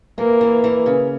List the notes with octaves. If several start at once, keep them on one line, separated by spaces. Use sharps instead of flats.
E3 A#3
E3
E3
C#3